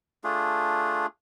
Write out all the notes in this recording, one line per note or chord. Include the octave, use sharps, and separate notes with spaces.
A3 D4 F4 G#4